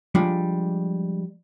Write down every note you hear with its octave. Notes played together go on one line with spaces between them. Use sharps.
F3 G3 G#3 D4